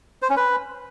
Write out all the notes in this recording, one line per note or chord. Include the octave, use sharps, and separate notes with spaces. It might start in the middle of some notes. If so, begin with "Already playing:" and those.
C5
C#4
B4